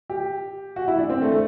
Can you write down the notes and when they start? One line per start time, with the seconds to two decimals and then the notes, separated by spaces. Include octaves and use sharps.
0.10 G4
0.76 F#4
0.88 E4
0.98 D4
1.10 C4
1.22 A3
1.32 A3